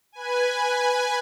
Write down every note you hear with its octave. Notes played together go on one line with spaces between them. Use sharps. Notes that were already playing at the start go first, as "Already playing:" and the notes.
B4 G#5